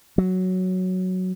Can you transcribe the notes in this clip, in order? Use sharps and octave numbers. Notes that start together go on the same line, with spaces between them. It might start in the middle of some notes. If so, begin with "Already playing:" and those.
F#3